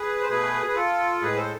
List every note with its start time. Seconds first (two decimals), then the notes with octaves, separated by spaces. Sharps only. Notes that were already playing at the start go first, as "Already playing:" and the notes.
Already playing: G#4 B4
0.22 C5
0.29 B2 A3 G#4 B4
0.68 B4
0.75 F4 A4
1.21 A2 G#3 G#4 B4
1.36 A4 C5